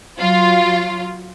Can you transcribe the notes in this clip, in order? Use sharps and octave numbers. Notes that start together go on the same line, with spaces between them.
F#3 F4